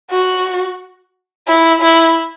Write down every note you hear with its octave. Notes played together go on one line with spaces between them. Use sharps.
F#4
E4
E4